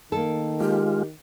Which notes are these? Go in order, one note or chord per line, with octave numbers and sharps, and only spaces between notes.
D#3 A#3 A4
G#3 F4 G4